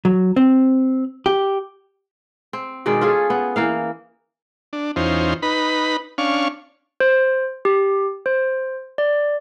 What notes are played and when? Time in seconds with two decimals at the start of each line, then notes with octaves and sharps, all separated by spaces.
0.05 F#3
0.36 C4
1.26 G4
2.53 C4
2.86 B2 D#3 G#3 D5
3.01 C#4 F4 G#4 A4
3.30 B3
3.56 E3 A#3 F5
4.73 D4
4.96 E2 C#4 D#4 F4 C5
5.42 D#4 B4 B5
6.18 C#4 D4 F5 C#6
7.00 C5
7.65 G4
8.26 C5
8.98 D5